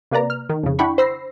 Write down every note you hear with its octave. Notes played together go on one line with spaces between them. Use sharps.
C3 A#3 B4 D5 A#5
F6
D#3
F2 C#3
D4 E4 F#5 G5 B5 C#6
C5 B5 E6 A#6 C7